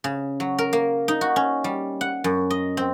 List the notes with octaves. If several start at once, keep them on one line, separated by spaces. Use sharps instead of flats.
C#3
F#3
A#4
A#3
D#4
F#4
C#4
G3
F#5
F#2
D#5
C4